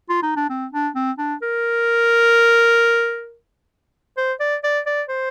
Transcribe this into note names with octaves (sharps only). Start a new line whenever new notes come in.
F4
D#4
D4
C4
D4
C4
D4
A#4
C5
D5
D5
D5
C5